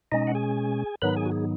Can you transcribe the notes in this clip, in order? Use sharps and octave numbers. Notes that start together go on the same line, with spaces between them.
B2 G#3 C#4 D#4 D#5
F#5
G#4 G#5
G#2 D#3 F#3 B3 D#4 B4 B5
G#4 G#5
F#4
G#4